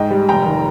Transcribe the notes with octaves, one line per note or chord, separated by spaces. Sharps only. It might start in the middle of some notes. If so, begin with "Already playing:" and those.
Already playing: G#2 D#5 G5
G3
F1 G5 A#5
D#3